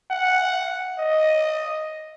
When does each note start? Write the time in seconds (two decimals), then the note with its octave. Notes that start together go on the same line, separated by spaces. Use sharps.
0.11 F#5
0.99 D#5